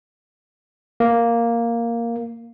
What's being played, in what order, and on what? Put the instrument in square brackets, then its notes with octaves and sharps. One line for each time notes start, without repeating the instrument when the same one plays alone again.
[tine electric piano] A#3